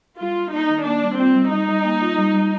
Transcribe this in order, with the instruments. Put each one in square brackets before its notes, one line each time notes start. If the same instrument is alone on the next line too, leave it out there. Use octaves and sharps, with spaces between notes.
[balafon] G3 [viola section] F4
[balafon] G3
[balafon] A#3 [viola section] D#4
[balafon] D#3
[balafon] A#3 [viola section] D4
[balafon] G3
[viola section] C4 [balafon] F4
[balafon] G3
[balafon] G3 [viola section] D#4
[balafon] G3
A#3
F4
G3
G3